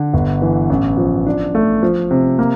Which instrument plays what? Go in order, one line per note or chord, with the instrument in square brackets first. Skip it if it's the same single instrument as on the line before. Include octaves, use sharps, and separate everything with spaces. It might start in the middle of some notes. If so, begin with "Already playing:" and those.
Already playing: [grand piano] D3
G1
E3
A1
F3
D4
A3
F3
C3
A#3